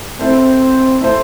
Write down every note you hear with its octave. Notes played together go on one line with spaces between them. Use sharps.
A3 C4 E4 A4 C5
A3 E4 A4 C5